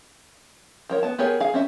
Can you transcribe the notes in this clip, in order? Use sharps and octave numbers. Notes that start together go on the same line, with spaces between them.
F3 A#4 C#5
B3 A5
B3 G4 G#4 A#4 C#5
G#4 F5
C4 C#4 E5